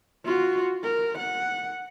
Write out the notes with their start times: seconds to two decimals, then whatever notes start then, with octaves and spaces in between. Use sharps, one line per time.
0.24 F4 F#4
0.84 A#4
1.19 F#5